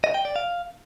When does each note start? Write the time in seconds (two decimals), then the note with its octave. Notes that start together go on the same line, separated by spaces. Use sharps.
0.04 D#5
0.14 G5
0.25 D5
0.36 F5